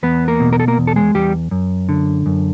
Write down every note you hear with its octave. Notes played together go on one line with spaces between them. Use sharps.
E2 B3 B4
A#3 A#4
B2
A#4
A4
A#3 A#4
E2
A4
G#3 G#4
E2 G3 G4
F#2
D3
F#2